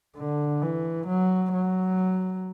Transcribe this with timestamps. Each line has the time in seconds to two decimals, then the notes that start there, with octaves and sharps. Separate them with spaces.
0.17 D3
0.62 E3
1.07 F#3
1.52 F#3